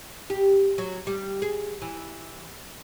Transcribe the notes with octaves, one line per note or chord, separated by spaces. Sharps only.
G4
F#3
G3
G#4
E3